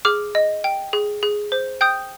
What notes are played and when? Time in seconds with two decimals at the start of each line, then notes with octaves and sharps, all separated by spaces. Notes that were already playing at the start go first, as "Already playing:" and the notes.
0.05 G#4 D6 F6
0.35 D#5
0.64 G5
0.93 G#4
1.23 G#4
1.52 C5
1.81 G5 D#6 G6